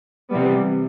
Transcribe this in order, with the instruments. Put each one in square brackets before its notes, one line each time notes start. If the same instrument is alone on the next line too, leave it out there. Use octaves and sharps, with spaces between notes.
[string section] C3 E3 G3 B3